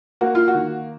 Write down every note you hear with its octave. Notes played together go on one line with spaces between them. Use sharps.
A#3 F#4
F4
F#4
D#3